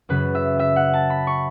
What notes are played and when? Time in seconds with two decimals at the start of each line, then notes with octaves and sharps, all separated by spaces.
0.09 F#2 C#3 F#3 B4
0.35 E5
0.59 E5
0.76 F#5
0.94 A5
1.10 B5
1.27 C#6